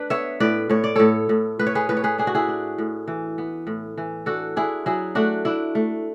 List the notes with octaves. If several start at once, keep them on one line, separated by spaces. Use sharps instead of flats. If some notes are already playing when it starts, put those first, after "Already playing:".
Already playing: D4 B4
B3 C#5 E5
A2 B4 D5
A2 C#5
D5
A2 A4 C#5
A2
A2 B4
C#5
G#4 B4
A2 B4
C#5
G#4 B4
D4 G#4
F#4
E4 G#4
D4
A2
E3
B3
A2
E3
D4 F#4 A4
D4 E4 G#4
F#3 E4 G#4
A3 D4 F#4
D4 E4
A3